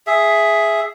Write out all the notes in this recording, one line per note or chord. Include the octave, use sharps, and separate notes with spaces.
G#4 E5